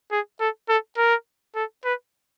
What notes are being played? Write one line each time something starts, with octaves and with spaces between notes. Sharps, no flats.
G#4
A4
A4
A#4
A4
B4